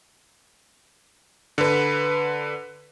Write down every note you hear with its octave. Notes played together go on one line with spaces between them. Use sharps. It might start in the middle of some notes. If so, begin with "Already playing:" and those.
D3 B4